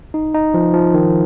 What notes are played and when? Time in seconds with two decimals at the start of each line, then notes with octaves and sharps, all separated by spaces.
0.14 D#4
0.34 D#4
0.54 F3
0.74 F3
0.94 D#3